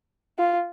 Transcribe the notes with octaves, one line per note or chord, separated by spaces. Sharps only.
F4